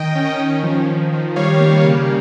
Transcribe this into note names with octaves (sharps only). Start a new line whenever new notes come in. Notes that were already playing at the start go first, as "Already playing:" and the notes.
Already playing: D#3 D#5 G5
C#4
C#4
F3
D#3
D#3
G3 C#5 F5
A#3
C#3